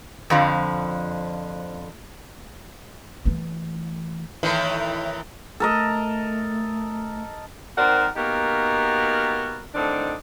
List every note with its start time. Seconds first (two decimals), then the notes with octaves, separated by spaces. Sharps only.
0.30 F2 D3 F3
3.25 E3 A3
4.43 A2 D#3 E3
5.60 A3 A4 A#4 D#5
7.78 D#3 C4 A#4 C5 D5 F#5
8.16 A#3 B3 D#4 F#4 G4 A#4
9.75 A2 D3 D#3 C4 D4 D#4